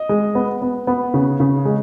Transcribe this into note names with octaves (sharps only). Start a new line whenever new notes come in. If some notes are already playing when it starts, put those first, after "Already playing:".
Already playing: D#5
G#3
B3
B3
B3
C#3
C#3
G#3